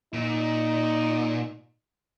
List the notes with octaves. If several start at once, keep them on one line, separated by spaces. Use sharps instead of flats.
A#2 D#4